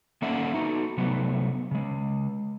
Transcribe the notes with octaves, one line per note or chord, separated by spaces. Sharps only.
A#3 C#4 A4 D5 E5 F#5
D#4 F#4 A4
C3 F#3 A3 B3
C#3 G#3